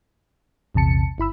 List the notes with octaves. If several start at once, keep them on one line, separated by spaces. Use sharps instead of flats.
A#1 E2 C3 A5 C#7
G1 E4 B5 E6